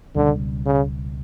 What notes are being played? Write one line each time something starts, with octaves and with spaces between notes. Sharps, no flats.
C#2 B2 D3 G3
C#3